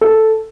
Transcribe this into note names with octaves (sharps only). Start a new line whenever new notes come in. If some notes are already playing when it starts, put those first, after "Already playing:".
A4